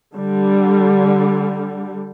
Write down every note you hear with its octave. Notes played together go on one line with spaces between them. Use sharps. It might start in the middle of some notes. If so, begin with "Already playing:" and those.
D3 G3